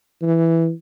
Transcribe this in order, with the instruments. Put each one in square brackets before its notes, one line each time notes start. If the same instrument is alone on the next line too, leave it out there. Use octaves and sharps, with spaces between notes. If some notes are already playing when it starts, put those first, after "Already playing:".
[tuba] E3